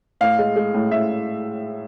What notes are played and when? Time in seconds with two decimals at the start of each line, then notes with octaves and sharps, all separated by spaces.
0.21 A2 F5
0.39 G#3
0.56 G#3
0.74 A2
0.92 A2 E5